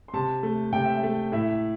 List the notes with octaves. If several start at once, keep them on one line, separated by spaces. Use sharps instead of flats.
C6
C3 A5
A3
C3 G5
E5
G5
A3
A2 E5